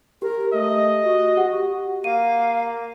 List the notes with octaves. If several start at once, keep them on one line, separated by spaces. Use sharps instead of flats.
G4 A#4
A3 D#5
F#4
G4 F#5
A#3 F5 D#7